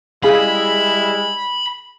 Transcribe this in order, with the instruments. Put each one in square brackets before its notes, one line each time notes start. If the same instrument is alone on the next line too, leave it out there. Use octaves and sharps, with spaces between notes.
[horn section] G3 G#3 E4 [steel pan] G#4 F5 G#5 [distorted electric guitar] B5